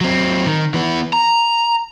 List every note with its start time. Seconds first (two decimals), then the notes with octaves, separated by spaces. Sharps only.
0.01 F#3 C4
0.46 D#3
0.74 E3 B3
1.13 A#5